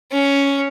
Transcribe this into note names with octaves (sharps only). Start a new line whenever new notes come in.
C#4